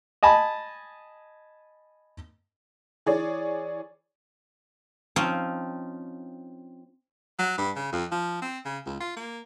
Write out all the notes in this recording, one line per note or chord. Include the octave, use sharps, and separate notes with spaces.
D#5 G#5 A5 B5
E3 G#4 C#5 D5
F3 C4 C#4 D#4
F#3
G2
C#3
F2
F3
C4
C#3
C#2
F4
A#3